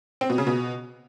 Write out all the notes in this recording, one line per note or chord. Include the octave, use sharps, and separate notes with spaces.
C4
B2
C#3
B2